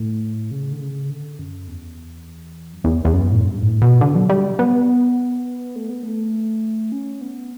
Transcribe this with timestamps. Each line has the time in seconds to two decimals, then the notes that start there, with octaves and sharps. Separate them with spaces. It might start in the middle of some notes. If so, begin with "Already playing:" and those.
Already playing: A2
0.51 C#3
0.72 D3
0.81 C#3
1.10 D3
1.39 F#2
1.68 E2
2.73 F#2
2.84 E2
3.05 E2
3.13 F#2
3.32 A2
3.43 G2
3.62 A2
3.82 B2
4.01 D3
4.15 F#3
4.29 G3
4.59 B3
5.76 A3
5.90 B3
6.03 A3
6.92 C#4
7.21 B3